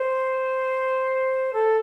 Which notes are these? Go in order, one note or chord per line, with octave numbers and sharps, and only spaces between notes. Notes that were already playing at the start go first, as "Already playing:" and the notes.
Already playing: C5
A4